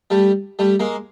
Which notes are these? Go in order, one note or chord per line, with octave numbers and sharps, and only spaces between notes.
G3 A3
G3 A3
G#3 A#3